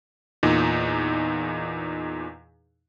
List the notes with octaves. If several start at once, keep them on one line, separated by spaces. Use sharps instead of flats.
E2 A#2 D#4